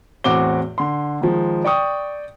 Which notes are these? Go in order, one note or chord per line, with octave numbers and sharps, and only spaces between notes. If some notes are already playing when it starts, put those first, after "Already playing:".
E2 A2 C4 F#4 D6 G7
D3 C6
D#3 F3 G#3
D5 G5 C#6 D#6